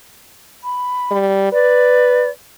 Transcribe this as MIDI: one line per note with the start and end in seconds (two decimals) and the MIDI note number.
0.64 1.17 83
1.11 1.49 55
1.52 2.28 71
1.52 2.30 74